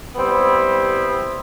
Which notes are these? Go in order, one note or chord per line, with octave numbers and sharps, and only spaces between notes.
G3 B3 C4 E4